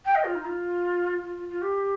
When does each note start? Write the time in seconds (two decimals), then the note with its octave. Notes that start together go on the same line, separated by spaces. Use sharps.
0.05 G5
0.15 D#5
0.24 F4
0.35 D#4
0.45 F4
1.23 F4
1.36 F4
1.49 F4
1.62 G4